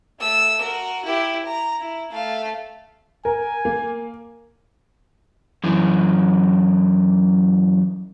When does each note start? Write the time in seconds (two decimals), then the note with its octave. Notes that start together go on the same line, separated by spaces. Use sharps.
0.19 A3 E6
0.61 F#4 A#4
1.04 E4 G4
1.46 A#5
1.81 E4
2.12 A3 F5
3.25 A#4 G#5
3.65 A#3
5.64 F#2 E3